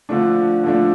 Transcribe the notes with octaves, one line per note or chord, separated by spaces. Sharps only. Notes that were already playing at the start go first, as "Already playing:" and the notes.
D3 F3 A3 D4
D3 F3 A3 D4